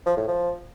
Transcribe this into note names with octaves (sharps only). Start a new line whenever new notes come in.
F3
A2
F3